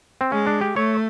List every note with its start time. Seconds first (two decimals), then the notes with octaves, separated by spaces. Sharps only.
0.21 C4
0.31 G#3 C#4
0.47 D4
0.61 G4
0.76 A3 C#5